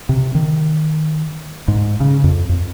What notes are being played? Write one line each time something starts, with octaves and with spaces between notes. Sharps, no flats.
C3
D#3
G#2
C#3
F2
F2